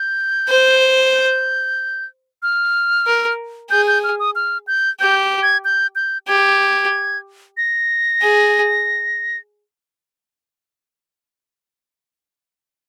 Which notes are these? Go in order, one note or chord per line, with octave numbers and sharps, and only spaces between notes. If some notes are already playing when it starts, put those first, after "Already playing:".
Already playing: G6
C5
G6
F6
A#4
G#4 G6
G6
F6
D#6
F6
G6
G4 G6
G#6
G6
G6
G4 G#6
A#6
G#4